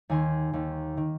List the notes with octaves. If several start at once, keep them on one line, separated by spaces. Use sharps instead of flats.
D#2 D#3 G#5 C6
D#2 D#3
D#3